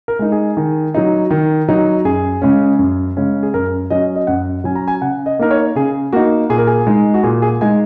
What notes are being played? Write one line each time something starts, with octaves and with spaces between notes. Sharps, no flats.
A#4
G#3 D#4
G#4
D#3
F#3 D#4
D#3
F#3 D#4
F#2 G#4
C#3 G#3 C#4
F#2
C#3 G#3 C#4
G#4
F#2 A#4
F#3 C#4 D#5
D#5
F#2 F#5
F#3 C#4 G#5
A#5
G#5
C#3 F#5
D#5
A#3 D#4 A#4
C#5
C#3 G#4
A#3 D#4 F#4
A#2 G#4
A#4
G#4
G#3 D#4
F#4
A#2 G#4
G#4
G#3 D#4 G#5